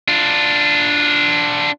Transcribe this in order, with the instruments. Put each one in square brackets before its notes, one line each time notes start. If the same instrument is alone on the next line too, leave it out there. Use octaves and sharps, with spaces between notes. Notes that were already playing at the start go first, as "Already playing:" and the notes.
[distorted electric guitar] D4 F4